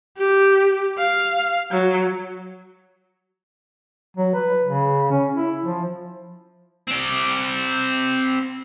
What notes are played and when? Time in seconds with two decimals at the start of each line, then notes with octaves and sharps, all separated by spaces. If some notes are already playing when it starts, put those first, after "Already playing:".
0.17 G4
0.98 F5
1.71 F#3
4.17 F#3
4.35 B4
4.64 C#3
5.12 C#4
5.35 E4
5.64 F3
6.87 C4 D5